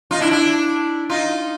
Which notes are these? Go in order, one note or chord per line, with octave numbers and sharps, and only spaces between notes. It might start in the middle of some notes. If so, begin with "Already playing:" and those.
D#4 F4
D4 E4
D4 E4
D#4 F4